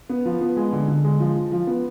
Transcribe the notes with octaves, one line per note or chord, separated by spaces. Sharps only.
B3
F3
B3
G#3
D3
D3
G#3
F3
F3
F3
B3